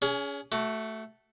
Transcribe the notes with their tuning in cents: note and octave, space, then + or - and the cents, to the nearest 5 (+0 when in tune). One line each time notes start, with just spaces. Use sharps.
C#4 +30 G#4 +0
A3 +0 F#4 +25